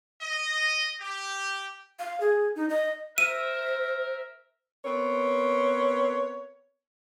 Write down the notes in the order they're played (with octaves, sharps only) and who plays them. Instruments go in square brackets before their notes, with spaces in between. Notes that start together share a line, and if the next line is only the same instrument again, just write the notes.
[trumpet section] D#5
G4
[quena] F5
G#4
D#4
D#5
[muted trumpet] A#4 [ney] C5 [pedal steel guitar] E5 [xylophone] D#7
[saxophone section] B3 C4 A#4 C#5